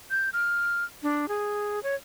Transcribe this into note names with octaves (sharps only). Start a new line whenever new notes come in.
G6
F6
D4
G#4
C#5